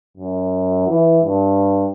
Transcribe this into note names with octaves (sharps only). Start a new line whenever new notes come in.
F#2
E3
G2